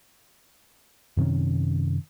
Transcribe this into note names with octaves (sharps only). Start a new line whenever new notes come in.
F#2 C3 D#3 C#4